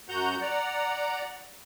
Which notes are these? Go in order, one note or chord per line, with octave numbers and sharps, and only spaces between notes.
F#2 F#4 F#5 A#5 G6
D5 F#5 A#5